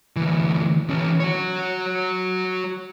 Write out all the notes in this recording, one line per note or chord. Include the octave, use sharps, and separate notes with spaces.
D2 E3
E3 C#4
F#4 C#5